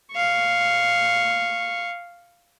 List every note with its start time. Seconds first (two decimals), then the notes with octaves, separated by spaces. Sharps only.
0.13 F5 C#6